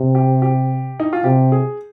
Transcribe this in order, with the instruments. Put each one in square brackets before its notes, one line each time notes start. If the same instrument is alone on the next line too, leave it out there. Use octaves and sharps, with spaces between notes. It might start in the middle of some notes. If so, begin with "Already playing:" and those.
Already playing: [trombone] C3
[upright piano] G4
G4
D#4
F4
[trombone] C3 [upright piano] G4
[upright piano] G#4